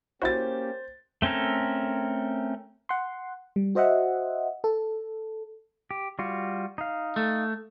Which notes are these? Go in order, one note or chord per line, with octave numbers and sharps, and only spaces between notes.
A#3 C#4 E4 F#4 G4 C5 A6
A3 C4 C#4 A4 A#4
F#5 C6
G3
F#4 C5 D#5 E5 F#5
A4
G4
G3 F4 F#4
D#4 F5
A3